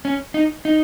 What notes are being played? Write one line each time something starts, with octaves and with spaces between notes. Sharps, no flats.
C#4
D#4
D#4